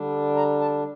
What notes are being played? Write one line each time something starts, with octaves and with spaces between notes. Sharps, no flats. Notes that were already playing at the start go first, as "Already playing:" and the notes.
Already playing: D3 G3 D4
A#5
A5